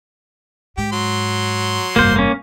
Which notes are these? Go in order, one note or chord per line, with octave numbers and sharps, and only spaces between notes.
G#2 G4
F#3 C6
F1 G2 A#3 C5
A#3 C#4